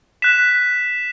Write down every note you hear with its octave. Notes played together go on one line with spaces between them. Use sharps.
F#6 B6 E7